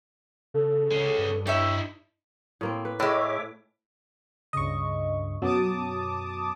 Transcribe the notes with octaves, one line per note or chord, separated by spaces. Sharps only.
C#3 A4
C#3 G#3 C#4
G2
D#4 E4 G4 C#5 E5
A2 A#3 C4
B4
A2 G#3 C#5 E5 D6
C#2 G2 C#3 D#5 C#6
F#2 B2 F#3 A5 D6 D#6